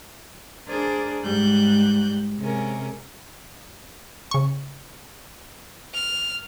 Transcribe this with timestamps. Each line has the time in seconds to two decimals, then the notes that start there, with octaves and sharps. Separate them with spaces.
0.68 D4 G#4 A#4 C5 D5
1.23 G#2 G3 F#6 G6
2.39 C3 G#3 C#4 A#4
4.31 C#3 C#6
5.94 F6